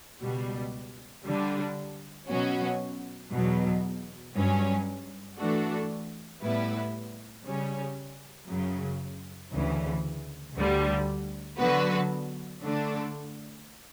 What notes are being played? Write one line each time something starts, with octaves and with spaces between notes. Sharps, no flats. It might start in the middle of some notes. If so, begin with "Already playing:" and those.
C#2 B2 G3
D3 G3 D4
B2 F#3 C#4 F#4
E2 B2 F#3
G2 F#3 C#4
E3 A3 D4 F#4 A4
A2 G3 B3 E4 B4
C#3 G3 C#4
F#2 C#3 F#3
D2 C#3 E3
D2 D3 G3
D3 F#3 B3 F#4 B4
D3 A3 D4